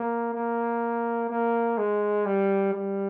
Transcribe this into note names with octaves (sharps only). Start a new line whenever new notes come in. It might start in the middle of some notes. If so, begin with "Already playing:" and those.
Already playing: A#3
A#3
A#3
G#3
G3
G3